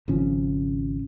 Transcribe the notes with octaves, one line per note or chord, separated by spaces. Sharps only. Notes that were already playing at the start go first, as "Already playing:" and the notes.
G#1 C#3 F3 C#4